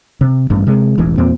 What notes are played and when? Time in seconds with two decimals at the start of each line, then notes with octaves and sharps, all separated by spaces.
0.21 C3
0.50 A1 G2
0.67 C3 G#3
0.98 E1 A1 E3
1.17 E2 A#2 C4